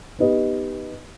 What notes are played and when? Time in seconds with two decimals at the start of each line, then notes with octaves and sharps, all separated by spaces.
0.19 B3 D#4 G4 B4 D#5